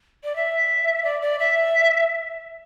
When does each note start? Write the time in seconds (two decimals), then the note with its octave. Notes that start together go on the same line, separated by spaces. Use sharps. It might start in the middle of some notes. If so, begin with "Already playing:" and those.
0.24 D5
0.36 E5
1.04 D5
1.22 D5
1.39 E5